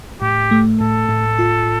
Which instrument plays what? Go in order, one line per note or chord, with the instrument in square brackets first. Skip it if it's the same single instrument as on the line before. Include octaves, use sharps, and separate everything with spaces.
[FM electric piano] A2 [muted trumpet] G4
[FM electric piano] A3
[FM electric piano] A2 [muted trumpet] A4
[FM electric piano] A2
F4